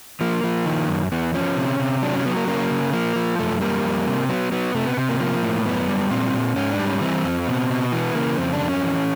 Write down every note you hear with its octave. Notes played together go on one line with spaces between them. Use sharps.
F3 A#3
F3
D#3
F#2
E2 B3
F3 C#4
C3
C3
F#3 D4
C#4
F#3 B3
A#3
C#3 A#3
C#3
F3 A#3
F3
F#2 A3
G3 A#3
F2
C3
F#3 B3
F#3 B3
C3 A3
B3
C3
A#3
F3 A#3
A2
F#2 B3
G3
A#2 C4
A#2
G#2 C#4
D4
G3
C#4
E3 C4
F2
B2
B2
E3 B3
C#3 A#3
F2 C4
D4
F2
C#4
E3